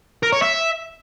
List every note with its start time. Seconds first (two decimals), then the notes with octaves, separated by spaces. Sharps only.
0.23 A#4
0.32 C#5
0.42 E5